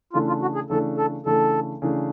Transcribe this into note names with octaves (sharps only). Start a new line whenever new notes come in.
C#3 E3 A3 D4 F4
F4
F#4
G#4
C#3 E3 A3 D4 A4
A4
C#3 E3 A3 D4 A4
C#3 E3 A3 D4